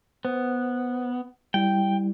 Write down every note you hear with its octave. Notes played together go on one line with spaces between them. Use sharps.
B3 C5
G3 E4 G5